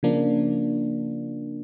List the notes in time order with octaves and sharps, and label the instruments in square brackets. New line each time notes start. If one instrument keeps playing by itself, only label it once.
[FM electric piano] C#3 F3 A#3 D4